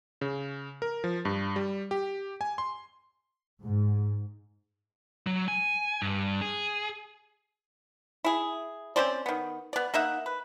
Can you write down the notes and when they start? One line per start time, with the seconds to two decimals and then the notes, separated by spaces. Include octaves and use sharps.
0.21 C#3
0.82 A#4
1.04 F3
1.25 G2
1.56 G3
1.91 G4
2.41 G#5
2.58 C6
3.62 G#2
5.27 F#3
5.48 G#5
6.02 G2
6.41 G#4
8.24 E4 G#4
8.96 C4 C#4 C5 D5
9.26 D#3 B3
9.73 B3 D5
9.94 A#3 D#4 E5 F#5
10.26 B4